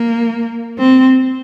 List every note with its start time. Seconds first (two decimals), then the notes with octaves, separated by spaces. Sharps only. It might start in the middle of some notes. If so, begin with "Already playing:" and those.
Already playing: A#3
0.79 C4